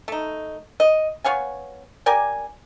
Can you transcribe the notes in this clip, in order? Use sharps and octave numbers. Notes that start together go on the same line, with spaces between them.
A3 D#4
D#5
B3 C#5 F5 G#5
G4 A#4 D5 G#5